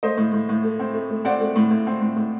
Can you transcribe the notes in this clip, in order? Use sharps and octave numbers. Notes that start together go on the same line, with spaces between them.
A3 C5 D#5
A2
A2
A2
A3
C4
A3
A3
C4 D5 F#5
A3
A2
A2
C4
A2
A2